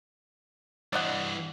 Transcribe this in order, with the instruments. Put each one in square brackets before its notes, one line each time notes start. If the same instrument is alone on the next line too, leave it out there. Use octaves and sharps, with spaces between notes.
[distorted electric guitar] G2 E3 [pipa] D5 D#5 F#5